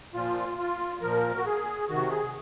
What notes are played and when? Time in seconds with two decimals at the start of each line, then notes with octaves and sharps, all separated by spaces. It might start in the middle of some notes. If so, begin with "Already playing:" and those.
0.14 A#2 F3 F4
0.58 F4
1.01 A#2 F3 A#4
1.37 F#4
1.46 G#4
1.89 C3 D#3 F#4
2.11 G#4